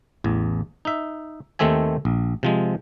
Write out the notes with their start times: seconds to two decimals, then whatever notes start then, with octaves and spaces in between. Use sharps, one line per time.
0.24 A1 E2
0.85 D#4 E5
1.59 D#2 D#3 A3 C4 E5 G#5
2.05 A#1
2.43 C3 F3 G#3